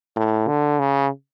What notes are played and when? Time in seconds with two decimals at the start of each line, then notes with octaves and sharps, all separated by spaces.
0.16 A2
0.48 D3
0.80 C#3